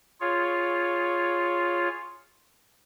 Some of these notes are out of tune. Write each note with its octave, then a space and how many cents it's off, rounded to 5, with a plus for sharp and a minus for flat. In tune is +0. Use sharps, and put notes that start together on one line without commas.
F4 +0 G#4 +0 C#5 +0